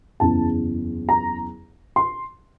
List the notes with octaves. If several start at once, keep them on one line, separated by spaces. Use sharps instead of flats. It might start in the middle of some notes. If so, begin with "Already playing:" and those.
F#1 E2 C#3 A5
A#5
C6